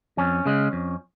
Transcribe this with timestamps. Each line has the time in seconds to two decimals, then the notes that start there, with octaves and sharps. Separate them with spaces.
0.18 F2 C#4
0.46 C#3 G#3
0.73 F2